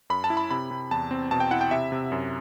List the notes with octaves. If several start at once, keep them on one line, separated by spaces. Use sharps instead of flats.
F#2 B5
A5
E4
B5
C3 B5
C3
E2 A5
C4
B2 A5
G5
E4 F#5
G5
C3 E5
C3
F#2